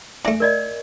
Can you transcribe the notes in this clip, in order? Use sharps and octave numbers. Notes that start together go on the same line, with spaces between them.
A3 D4 E5 G#5
A#4 D5 D#5